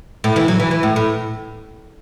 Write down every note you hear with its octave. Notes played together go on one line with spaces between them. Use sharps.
A2
E3
F#3
E3
E3
A2
A2